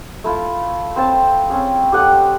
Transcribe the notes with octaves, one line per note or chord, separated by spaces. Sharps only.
A3 E4 F4
C4 C5 A5 C6
C4 C#4 G#4
G4 A4 D#5 F#5